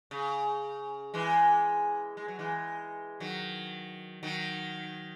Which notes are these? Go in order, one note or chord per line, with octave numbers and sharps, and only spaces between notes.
C#3
E3 G#3
G#3
F#3
E3 G#3
D#3 F#3
D#3 F#3